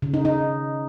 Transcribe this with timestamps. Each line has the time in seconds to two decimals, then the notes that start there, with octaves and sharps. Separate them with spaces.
0.02 C#3
0.14 D#4
0.25 D#4